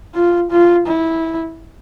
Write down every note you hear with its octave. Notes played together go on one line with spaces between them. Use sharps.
F4
F4
E4